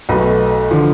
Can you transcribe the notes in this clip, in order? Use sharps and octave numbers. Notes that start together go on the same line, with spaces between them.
B1 B2 A3 B4
D3 F3